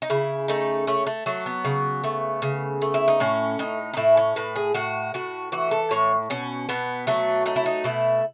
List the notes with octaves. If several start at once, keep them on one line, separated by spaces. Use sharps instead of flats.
D#4
C#3 E4
A3 D#4
A3 C#4
A3
F#3 A3
B3
C#3
A3
C#3
A3
E4
D#4
A2 C#4
A2 D#4
D#4
A2 E4
C#4
A2 B4
G#4
A2 F#4
A2 F#4
E3 F#4
A4
A2 C#5
B2 C#4
B2 B3
F#3 A3
A3 D#4
E4
D#4
B2 E4